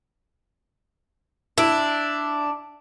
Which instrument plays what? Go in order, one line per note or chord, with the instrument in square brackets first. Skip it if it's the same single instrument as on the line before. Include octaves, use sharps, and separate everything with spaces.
[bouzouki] D4 [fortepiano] E4